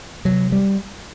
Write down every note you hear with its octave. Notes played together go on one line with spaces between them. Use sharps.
C3 F#3
G3